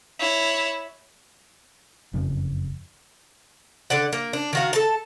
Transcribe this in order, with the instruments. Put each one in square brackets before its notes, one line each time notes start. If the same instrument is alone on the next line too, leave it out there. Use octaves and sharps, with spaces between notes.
[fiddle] E4 C#5
[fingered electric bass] F#1 F2 C#3
[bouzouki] D3 D5 F#5
A#3
D4
D#3 F#4 F5
A4 A5